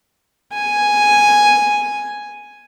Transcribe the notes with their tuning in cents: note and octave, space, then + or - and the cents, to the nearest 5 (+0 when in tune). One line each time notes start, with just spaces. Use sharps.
G#5 +0